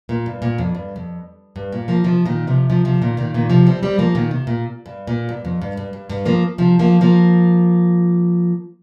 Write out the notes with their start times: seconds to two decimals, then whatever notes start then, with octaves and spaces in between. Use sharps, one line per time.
0.09 A#2
0.26 G2
0.42 A#2
0.58 F2
0.75 G2
0.96 F2
1.56 G2
1.72 A#2
1.88 F3 A#3
2.04 C3 F3
2.26 A#2 D#3
2.47 C3 F3
2.70 C3 F3
2.85 C3 F3
3.02 A#2 D#3
3.17 A#2 D#3
3.34 A#2 D#3
3.50 C3 F3
3.66 G3 C4
3.83 G3 C4
3.99 F3 A#3
4.15 A#2 D#3
4.31 C3
4.47 A#2
4.86 G2
5.07 A#2
5.29 G2
5.45 F2
5.62 G2
5.77 G2
5.93 G2
6.10 G2
6.26 F3 A#3
6.58 C3 F3
6.79 F3 A#3
7.01 F3 A#3